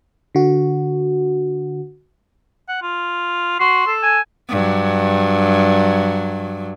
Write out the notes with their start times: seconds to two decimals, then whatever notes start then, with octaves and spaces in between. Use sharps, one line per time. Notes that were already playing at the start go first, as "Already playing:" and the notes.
0.35 D3 F#4
2.68 F#5
2.82 F4
3.60 F#4 C6
3.87 A4
4.03 G#5
4.49 G2 F#3